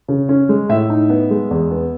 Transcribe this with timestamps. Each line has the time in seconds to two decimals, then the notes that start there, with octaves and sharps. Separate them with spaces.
0.08 C#3
0.29 C#4
0.49 G#3
0.69 A2 E5
0.90 D#4
1.10 B3
1.30 G#3
1.51 E2
1.71 B3